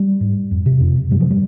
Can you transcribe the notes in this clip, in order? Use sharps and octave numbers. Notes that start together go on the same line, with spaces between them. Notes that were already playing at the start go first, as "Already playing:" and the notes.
Already playing: G3
G#2
F2
C3
F2
C3
G2 G3
F3
G3